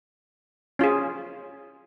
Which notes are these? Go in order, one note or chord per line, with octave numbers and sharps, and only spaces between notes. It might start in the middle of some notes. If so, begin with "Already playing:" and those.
C#4 F4 G#4